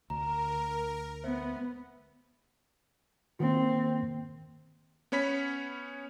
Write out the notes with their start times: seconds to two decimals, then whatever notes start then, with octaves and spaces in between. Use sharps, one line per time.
0.10 D2 A#4 A#5
1.24 B3 C5 E5
3.40 D#3 A#3 C4
5.12 B3 C#4 C#5 B5 B6